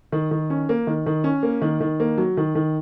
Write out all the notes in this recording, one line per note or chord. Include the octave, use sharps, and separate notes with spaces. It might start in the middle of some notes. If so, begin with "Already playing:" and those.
D#3
D#3
C#4
A#3
D#3
D#3
C#4
A#3
D#3
D#3
A#3
F#3
D#3
D#3